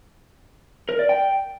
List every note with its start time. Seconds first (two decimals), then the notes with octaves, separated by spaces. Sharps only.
0.89 A#4
0.99 D5
1.09 G5